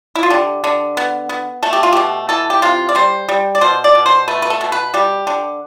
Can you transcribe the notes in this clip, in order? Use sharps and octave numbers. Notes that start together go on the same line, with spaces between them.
E4
F4
D3 G4
D3
B3
B3
A3 A4
G4
F4
B2 G4
E3 A4
G4
C3 F4
D5
G3 C5
G3
D5
B2 C5
D5
B2
C5
A3 B4
B4
A4
B2
B4
G3 G4
D3